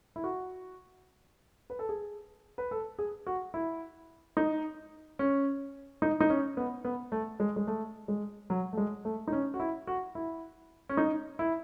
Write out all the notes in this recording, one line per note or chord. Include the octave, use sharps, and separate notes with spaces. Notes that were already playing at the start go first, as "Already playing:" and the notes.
E4
F#4
B4
A4
G#4
B4
A4
G#4
F#4
E4
D#4
C#4
D#4
D#4
C#4
B3
B3
A3
G#3
G#3
A3
G#3
F#3
A3
G#3
A3
D#4
C#4
F#4
E4
F#4
E4
C#4
D#4
E4